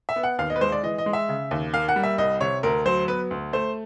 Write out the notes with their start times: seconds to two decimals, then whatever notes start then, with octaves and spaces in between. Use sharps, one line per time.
0.09 E5
0.16 B3
0.23 F#5
0.39 D#2 F5
0.50 D#5
0.56 B4
0.61 G#3 C5
0.72 D5
0.83 E3 D#5
0.98 D#5
1.06 G#3
1.13 E5
1.29 C#3
1.51 D#2
1.74 A#3 F5
1.89 F#5
1.96 G3
2.03 E5
2.18 C2 D#5
2.41 C3 C#5
2.63 D2 A#4
2.86 F#3 C5
3.08 B3 B4
3.31 D2
3.53 A3 C5